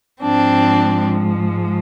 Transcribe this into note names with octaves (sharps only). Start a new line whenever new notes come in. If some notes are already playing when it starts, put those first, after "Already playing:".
G#2 F3 G#3 C4 D4